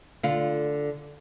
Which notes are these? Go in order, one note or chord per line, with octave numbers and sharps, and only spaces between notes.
D3 F4